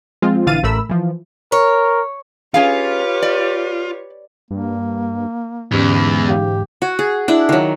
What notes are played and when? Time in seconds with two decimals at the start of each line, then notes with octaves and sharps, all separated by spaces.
0.22 F3 G#3 C4 F4
0.47 A#1 D3 E3 F5 A6 D#7
0.63 A1 A3 A#4 B5 E6
0.89 E3 F3
1.52 A#4 C#5
2.54 C#4 F4 G4 G#4 B4 C#5 F5
3.22 D5
4.51 G2 A#3
5.72 E2 G#2 D3 C#4 G4
6.27 E3 G4 F5
6.82 F#4
6.99 G#4
7.28 D4 E4
7.49 D#3 F#3